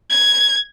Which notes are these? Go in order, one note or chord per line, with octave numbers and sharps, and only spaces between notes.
G#6